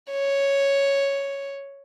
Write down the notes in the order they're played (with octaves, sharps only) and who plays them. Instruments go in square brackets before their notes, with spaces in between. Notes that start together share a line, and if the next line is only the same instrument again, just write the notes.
[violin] C#5